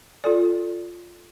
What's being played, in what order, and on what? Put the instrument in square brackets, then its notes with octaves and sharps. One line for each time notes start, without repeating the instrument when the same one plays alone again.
[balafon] F4 A4 D5